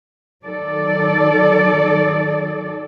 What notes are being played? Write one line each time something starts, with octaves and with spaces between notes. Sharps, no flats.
D#3 F#3 A4 D5